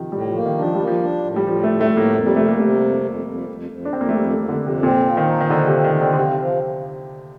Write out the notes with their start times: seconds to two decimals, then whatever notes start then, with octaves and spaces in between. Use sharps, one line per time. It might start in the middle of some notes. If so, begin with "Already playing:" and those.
Already playing: C3 D#3 F3
0.12 A2 G3
0.29 F3
0.35 A#3
0.46 D#3
0.57 F3 D4
0.75 G3 A#3
0.87 F3
1.02 D4
1.24 A2
1.36 G3
1.47 A2 F3
1.63 A3
1.69 A2
1.81 A3
1.91 A2
1.97 A#3
2.14 F2 A#3
2.26 G3
2.36 C3 A3
2.48 A#3
2.59 C3 A3
2.81 F2
3.04 F2
3.26 F2
3.49 F2
3.71 F2
3.85 D4
3.93 F2 C4
4.01 A#3
4.09 A3
4.16 F2 G3
4.25 A#3
4.33 A3
4.38 F2
4.49 D3
4.61 F2
4.67 C3
4.83 A#2 C4
5.06 F3
5.17 D#3
5.28 D#4
5.40 D#3
5.50 D3 F3
5.67 C3
5.73 C4
5.84 D#3
5.96 C4
6.01 D3
6.13 D3
6.17 C3 F3
6.40 F3